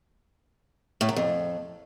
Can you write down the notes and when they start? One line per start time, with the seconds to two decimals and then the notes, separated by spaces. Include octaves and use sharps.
1.01 A2
1.09 F#2
1.16 F2